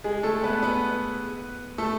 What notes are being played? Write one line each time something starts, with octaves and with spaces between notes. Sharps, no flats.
G#3 G#4
A3 A4
B3 B4
B3 B4
A3 A4